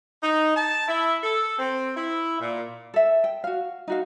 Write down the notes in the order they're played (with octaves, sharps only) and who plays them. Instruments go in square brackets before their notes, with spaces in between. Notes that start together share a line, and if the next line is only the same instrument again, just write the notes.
[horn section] D#4
A5
E4
A4
C4
E4
A#2
[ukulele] A4 E5
G5
F#4 F5
D#4 F#4 F5